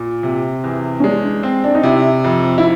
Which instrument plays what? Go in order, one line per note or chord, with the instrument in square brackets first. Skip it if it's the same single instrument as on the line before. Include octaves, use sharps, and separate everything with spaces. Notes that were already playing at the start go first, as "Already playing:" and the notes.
Already playing: [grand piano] A#2
C3
E2
[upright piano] C#4
[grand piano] G#3 [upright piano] D4
[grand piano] C4
[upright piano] D4
D#4
[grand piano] C3 [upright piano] E4
[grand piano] F2
[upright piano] E4